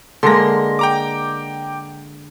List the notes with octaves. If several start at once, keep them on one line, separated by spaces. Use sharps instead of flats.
D3 G#3 A#3 C6 A#6
G5 A#5 D6